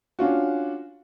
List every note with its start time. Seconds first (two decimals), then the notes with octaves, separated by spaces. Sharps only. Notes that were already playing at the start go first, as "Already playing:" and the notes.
0.19 C#4 D4 F4 F#4